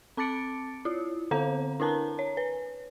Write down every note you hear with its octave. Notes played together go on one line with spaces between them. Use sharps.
C4 A5 D6 A6 C#7 D7
E4 F4
D3 C4 A4 C5 F5 A#5
D4 E4 A#4 A5 A#5
C#5
B4